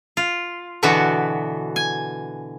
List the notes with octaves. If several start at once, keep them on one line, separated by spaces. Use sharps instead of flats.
F4
B2 D3 E3 B3 F#4
G#5